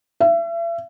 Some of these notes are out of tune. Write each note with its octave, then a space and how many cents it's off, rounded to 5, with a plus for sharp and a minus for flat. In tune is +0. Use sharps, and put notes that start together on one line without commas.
E5 +40